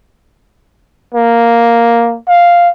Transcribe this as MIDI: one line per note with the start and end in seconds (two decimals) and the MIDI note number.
1.14 2.17 58
2.29 2.69 77